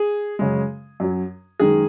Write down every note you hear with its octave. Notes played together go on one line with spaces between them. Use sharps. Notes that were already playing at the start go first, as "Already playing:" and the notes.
Already playing: G#4
F#2 C#3 G#3
F#2 F#3
F#2 D#3 G#3 G#4